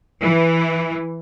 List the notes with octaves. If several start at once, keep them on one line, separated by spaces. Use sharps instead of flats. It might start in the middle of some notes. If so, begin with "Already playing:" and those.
E3